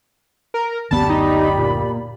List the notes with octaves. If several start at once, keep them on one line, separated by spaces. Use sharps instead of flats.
A#4
F#1 D2 B3 G4 D5 A5 B5
D#4
A#2